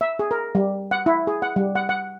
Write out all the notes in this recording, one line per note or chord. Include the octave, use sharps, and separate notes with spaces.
E5
G#4
A#4
G3
F#5
E4
G#4
F#5
G3
F#5
F#5